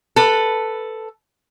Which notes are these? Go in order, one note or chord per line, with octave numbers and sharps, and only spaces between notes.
A4 B4